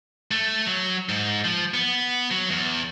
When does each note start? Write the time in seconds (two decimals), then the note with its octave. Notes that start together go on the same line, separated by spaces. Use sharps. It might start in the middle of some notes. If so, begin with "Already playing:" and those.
0.31 A3
0.66 F#3
1.09 G#2
1.45 F3
1.74 B3
2.31 F#3
2.50 E2